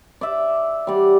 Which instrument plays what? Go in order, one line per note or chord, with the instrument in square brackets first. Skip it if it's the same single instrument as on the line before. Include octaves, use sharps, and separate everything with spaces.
[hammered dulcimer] D5 E5
G3 D5 F#5